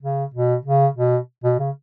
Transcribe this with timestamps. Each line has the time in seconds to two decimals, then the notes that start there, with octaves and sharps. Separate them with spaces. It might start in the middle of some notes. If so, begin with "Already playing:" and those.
0.02 C#3
0.34 B2
0.65 C#3
0.96 B2
1.44 B2
1.59 C#3